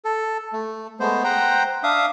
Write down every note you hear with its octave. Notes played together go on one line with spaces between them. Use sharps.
A4
A3
G#3 A3 B3 C5
C5 F#5 G5 A#5
D4 E5 F5 D#6